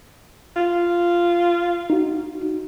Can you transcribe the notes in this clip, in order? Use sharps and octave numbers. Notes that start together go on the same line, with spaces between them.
F4
D#4 F#4